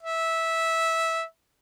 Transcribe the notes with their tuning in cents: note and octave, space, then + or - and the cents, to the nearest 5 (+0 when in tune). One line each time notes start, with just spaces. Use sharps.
E5 -10